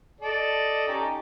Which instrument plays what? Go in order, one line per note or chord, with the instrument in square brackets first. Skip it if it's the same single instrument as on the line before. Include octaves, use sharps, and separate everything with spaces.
[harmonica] A4 D5 D#5
C#4 D#4 G4